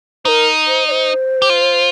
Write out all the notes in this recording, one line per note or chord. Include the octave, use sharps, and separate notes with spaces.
D#4 A#4 C5
C5
D5
C5
G4
F4